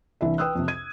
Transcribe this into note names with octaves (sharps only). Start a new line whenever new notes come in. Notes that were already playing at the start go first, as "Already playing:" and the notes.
C2 E3 D4 E5
B4 G5 D#6 E6 F#6
F2 C3
G#6 D#7